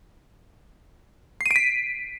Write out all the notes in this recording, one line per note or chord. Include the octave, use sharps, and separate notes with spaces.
C7
D#7
D7
B6